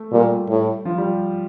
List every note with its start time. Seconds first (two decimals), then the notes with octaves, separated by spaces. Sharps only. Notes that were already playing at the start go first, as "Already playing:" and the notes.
Already playing: A3
0.12 A#2 G3
0.49 A2
0.85 F3
0.98 G3